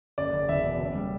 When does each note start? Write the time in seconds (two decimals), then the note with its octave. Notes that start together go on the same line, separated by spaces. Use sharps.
0.18 F#1 D5
0.33 F#1
0.49 E2 E5
0.64 B2
0.79 F#1
0.95 G3